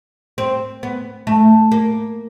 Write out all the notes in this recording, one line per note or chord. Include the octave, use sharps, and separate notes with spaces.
C4
B3
A3
A#3